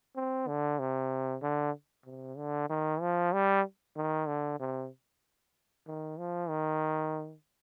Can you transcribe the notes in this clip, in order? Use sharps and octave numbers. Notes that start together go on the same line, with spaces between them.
C4
D3
C3
D3
C3
D3
D#3
F3
G3
D#3
D3
C3
D#3
F3
D#3